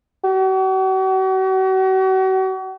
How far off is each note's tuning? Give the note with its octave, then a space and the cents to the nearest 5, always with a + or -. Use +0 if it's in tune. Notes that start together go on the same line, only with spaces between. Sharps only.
F#4 +40